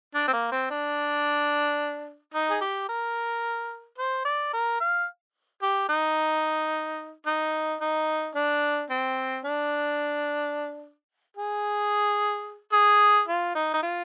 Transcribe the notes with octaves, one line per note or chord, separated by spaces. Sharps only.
D4
C4
A#3
C4
D4
D#4
G#4
G4
A#4
C5
D5
A#4
F5
G4
D#4
D#4
D#4
D4
C4
D4
G#4
G#4
F4
D#4
D#4
F4